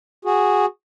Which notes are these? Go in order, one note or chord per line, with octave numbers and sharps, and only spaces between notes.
F#4 G#4